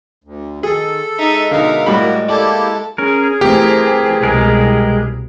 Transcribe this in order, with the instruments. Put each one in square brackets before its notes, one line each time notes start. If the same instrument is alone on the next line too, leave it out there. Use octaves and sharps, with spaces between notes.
[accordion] D2
[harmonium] D#3 [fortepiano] G#4 [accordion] A4
[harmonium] G#3 [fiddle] D#4 E5
[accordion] B2 E5 F5 [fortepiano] D3 D#4 [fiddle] A#4
[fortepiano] A2 G3 B5 [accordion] A#3 F#4
[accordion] A#3 E4 G4 [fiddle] A4 [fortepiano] D5
[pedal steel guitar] C#4 A#4 [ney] G#4
[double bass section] E3 A3 C4 [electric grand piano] G4 [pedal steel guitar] A#4
[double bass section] C2 B2 [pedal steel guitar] G#3 A#4